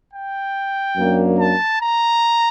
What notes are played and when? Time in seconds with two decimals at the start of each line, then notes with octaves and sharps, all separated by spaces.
0.11 G5
0.95 F#2 F#3 A#3 D4
1.37 A5
1.79 A#5